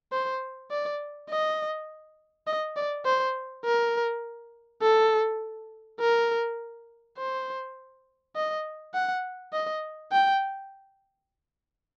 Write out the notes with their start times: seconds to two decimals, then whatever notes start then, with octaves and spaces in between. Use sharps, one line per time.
0.12 C5
0.71 D5
1.30 D#5
2.47 D#5
2.76 D5
3.05 C5
3.65 A#4
4.83 A4
6.00 A#4
7.18 C5
8.36 D#5
8.94 F#5
9.53 D#5
10.12 G5